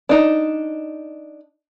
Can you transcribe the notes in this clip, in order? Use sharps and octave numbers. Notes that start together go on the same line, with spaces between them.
D4 D#4